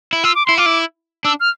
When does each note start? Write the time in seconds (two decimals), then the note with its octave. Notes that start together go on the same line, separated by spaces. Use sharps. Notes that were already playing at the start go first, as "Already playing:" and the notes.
0.13 E4
0.24 F4 E6
0.35 D6
0.46 E4 C6
0.58 F4 D6
0.66 E4
1.25 D4 E6
1.40 F6